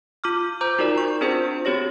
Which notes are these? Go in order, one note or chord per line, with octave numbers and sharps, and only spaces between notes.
F4 D6 F6
C5 A#5 D6 G6
D#4 F4 F#4 A#4 D5
C#6
C4 D4 F4 G#4 C5
C4 F#4 G4 C#5 A#6